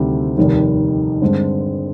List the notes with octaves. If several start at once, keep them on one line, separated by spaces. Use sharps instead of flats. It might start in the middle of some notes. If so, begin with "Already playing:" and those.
Already playing: D2 C3 D#3 G3 C4
F1 D#2 D#3 G3
G2 D3 G#3 C4